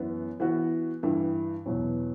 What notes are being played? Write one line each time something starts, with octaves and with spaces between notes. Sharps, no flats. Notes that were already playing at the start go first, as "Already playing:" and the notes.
Already playing: F#2 E3 B3
E3 B3 F#4
G2 E3 G3
E2 B2 F#3 B3